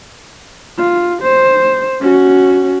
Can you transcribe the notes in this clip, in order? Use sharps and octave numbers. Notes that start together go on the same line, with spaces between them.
F4
C5
C#4 F#4